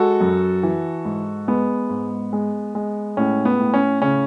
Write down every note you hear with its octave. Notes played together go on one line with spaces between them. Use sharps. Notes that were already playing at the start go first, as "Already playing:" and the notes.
Already playing: G#3 F#4 A4
F#2
E3
G#2
G#3 B3
G#2
G#3
G#3
A2 C#4
B3
A2
C#4
C#3 C#4